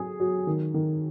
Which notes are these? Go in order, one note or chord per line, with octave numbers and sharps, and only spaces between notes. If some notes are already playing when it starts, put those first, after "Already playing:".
Already playing: F#3 G#4
F#3
D#3
D#3